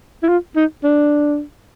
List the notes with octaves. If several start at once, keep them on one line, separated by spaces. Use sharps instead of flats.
E4
F4
D#4
D4